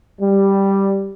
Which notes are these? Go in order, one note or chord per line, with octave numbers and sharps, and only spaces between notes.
G3